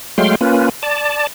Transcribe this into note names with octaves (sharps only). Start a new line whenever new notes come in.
F#3 G#3 A3 F5 G5 C6
A#3 C#4 F4 B4
D5 A5